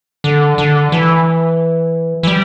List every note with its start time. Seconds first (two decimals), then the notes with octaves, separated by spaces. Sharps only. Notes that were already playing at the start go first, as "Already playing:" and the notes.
0.24 D3
0.58 D3
0.92 E3
2.23 E3
2.27 G3